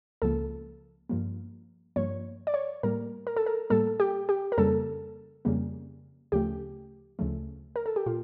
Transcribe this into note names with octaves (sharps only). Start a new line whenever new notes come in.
C#2 C#3 F3 A#3 A4
G2 F3 A#3
G2 F3 A#3 C#5
D5
C#5
A2 G3 A#3 A#4
A#4
A4
A#4
A2 G3 A#3 A4
G4
G4
A#4
F2 C#3 G3 A#3 A4
F2 C#3 G3 A#3
D2 C#3 F3 A3 G4
D2 C#3 F3 A3
A#4
A4
G4
A#2 F4